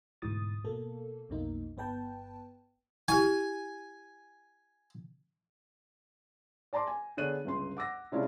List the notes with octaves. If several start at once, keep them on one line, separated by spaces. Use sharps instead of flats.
D2 G#2 B2 E3 D#6 A6
B2 A#3 A4
B1 F2 B2 A#3 D#4
G1 B3 B4 G5 A5
E4 G4 G#5
D5 A5 A#5 C6 D6
G#5
D3 B3 G#4 C#5 F#6 D#7
G1 C#2 C6
F#5 D6 E6 A#6
C3 G#3 C#4 D4 E4 F4